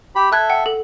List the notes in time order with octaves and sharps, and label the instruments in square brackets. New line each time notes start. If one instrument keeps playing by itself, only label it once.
[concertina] G4 B5
[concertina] A4 E5 [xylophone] E6 F#6 G#6
[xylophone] F#5 G5
A4